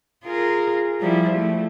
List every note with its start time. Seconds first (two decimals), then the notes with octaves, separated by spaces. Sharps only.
0.24 F4 G#4 A#4
1.01 F3 G3 E4
1.37 A3